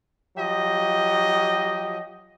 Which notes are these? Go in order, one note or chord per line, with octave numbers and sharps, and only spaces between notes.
F3 F#3 G4 D#5